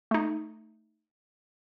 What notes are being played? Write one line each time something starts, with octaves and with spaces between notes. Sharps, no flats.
A3 D#4